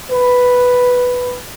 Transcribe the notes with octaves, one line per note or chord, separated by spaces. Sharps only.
B4